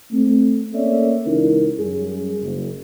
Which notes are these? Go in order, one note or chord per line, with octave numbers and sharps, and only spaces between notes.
A3 C4
A#3 C#4 A4 C#5 D5 E5
C#2 E3 C#4 D#4 E4 A#4
F#2 G3 G#4
F#1